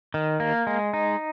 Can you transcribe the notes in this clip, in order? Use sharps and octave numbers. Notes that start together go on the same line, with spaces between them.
D#3
A#3
G#3
D#4